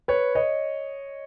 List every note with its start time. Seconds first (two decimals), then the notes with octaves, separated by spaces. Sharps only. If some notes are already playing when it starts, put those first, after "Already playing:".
0.08 B4 C#5
0.35 C#5 D#5